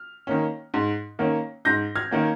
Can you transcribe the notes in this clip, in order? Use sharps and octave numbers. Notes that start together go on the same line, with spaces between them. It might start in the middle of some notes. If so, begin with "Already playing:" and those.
Already playing: F6
D#3 A#3 C#4
G#2
D#3 A#3 C#4
G#2 G6 A#6
F6 G#6
D#3 A#3 C#4